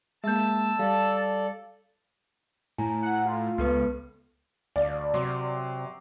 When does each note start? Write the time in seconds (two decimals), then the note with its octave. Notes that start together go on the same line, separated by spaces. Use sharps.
0.24 G#3 A#3 E5 A5 E6 G6
0.79 G3 A4 D5 F5
2.78 A2 G#5 A#5
3.02 F#5
3.26 F4
3.58 C#2 B3 A4 B4
4.76 D2 D5 F5
5.14 C3 F#3 C6 D6